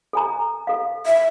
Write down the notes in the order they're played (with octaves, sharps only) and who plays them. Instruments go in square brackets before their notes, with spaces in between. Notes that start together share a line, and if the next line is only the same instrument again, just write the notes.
[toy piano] A4 G#5 A#5
A4 F5
[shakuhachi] E5